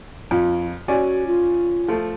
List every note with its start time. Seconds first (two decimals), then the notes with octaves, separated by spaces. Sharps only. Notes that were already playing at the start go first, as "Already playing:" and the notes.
0.31 F2 F4
0.88 C#4 F#4 D5 G#5
1.27 F4
1.88 F3 A3